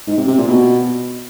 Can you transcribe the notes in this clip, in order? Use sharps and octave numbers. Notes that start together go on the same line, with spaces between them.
G#2
C3
C3
A#2
B2